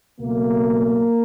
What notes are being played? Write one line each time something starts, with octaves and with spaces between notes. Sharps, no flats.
C#2 B2 F#3 A3 A#3